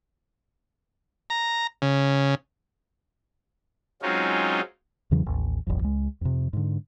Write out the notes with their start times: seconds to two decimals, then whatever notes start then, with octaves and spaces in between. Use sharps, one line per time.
1.30 A#5
1.82 C#3
4.02 F#3 G#3 C4 C#4 D#4 F4
5.11 E2 C#3 E3 F#3
5.26 A1 D#2
5.67 D#1 A1 F2
5.83 C#2 G#3
6.21 F2 C3
6.53 G#2 D3